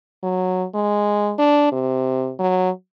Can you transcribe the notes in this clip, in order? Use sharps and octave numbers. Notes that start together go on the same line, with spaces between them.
F#3
G#3
D4
C3
F#3